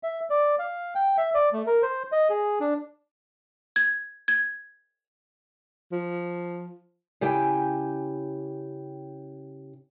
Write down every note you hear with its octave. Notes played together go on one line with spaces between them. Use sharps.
E5
D5
F5
G5
E5
D5
A3
A#4
C5
D#5
G#4
D4
G#6
G#6
F3
C#3 E4 G4 G5 G#5